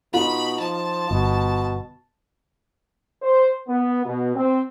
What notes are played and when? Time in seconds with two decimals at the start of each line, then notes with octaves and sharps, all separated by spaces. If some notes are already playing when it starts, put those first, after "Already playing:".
0.14 B2 D#4 F4 B5
0.60 F3 A5
1.11 G1 B2
3.22 C5
3.68 B3
4.06 B2
4.35 C4